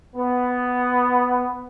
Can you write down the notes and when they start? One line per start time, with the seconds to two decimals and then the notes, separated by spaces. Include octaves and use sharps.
0.16 B3